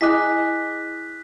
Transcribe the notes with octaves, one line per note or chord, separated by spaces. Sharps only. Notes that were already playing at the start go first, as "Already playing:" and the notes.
E4 G#4 D#5 G#5 D6 F#6 B6